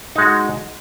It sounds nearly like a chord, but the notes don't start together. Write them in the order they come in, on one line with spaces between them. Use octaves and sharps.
D#4 G#3 F#4